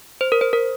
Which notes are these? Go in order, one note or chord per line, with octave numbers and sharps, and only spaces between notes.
C5
A#4
C5
A#4